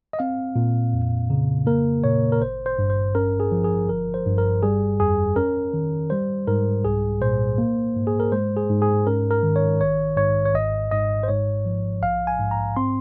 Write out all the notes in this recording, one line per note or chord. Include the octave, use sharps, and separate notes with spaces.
D#5
C4 F5
A#2
F2
C#3
A#3 A#4
A#2 C#5
A#4
G#1 C5
C5
G2
C5
C#4 A#4
G#4
F3
G#4
G1 A#4
C5
G2
A#4
G3 G#4
F2 G#4
C#4 A#4
D#3
G3 C5
G#2 A#4
C2 G#4
A#2 C5
A#3
G#2
G#4
A#4
G#3 C5
G#4
G#2
G#4
C#4 A#4
A#4
D#3
C#5
A#1 C#5
G#2 C#5
C#5
G#1 D#5
G#2 D#5
C5
G#2 C#5
F3
A#1 F5
G#5
G#2
A#5
C4 C6